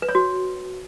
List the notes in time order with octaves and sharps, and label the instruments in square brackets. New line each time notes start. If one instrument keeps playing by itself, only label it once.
[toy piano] B4
C#5
F#4